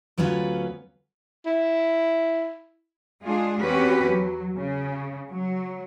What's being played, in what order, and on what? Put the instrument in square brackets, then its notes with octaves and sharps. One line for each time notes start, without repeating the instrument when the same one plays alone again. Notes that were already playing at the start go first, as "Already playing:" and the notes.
[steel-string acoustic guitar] D2 F#3 B3 C#4 F4 B4
[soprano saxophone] E4
[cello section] G#3 D4 F4 G#4
E2 C4 C#4 F#4 G4 B4
F#3
C#3
F#3